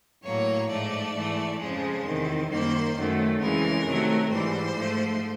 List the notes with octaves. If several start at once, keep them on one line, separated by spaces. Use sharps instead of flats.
A2 F#3 A#3 C#5
G#2 F3 A3 D5
G#2 E3 A3
F2 C#3 F3 G#3 C5
E2 C3 D#3
F#2 D#3 G3 A#3 C5
F#2 D#3 F#3 A3
F2 C#3 E3 G#3 A#4
C3 D#3 F#3 A3
G#2 E3 G3 C5
G#2 F3 A3